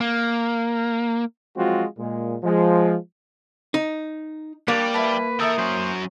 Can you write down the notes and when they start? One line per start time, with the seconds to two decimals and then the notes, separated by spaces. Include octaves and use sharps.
0.01 A#3
1.57 F3 F#3 G#3 C4 F4 F#4
1.98 A#2 G#3
2.43 F3 G#3
3.74 D#4
4.68 G3 A#3 D4 G4 C#5
4.94 E4 F#4 B4 A5
5.40 E4 F4 A4 A#4 G5 D#6
5.58 F#3 C#4 C5